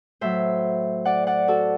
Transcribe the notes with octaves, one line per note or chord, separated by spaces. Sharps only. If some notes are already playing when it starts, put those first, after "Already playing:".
A2 F#3 C5 E5
D5 F#5
D5 F#5
F#4 A4